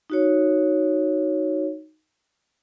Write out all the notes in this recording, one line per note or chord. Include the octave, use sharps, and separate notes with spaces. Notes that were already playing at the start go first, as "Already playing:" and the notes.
D#4 F#4 C#5